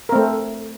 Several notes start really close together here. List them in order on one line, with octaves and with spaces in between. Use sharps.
A#4 C4 A3